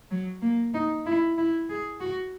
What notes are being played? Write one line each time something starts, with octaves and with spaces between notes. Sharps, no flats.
F#3
A#3
D#4
E4
E4
G#4
F#4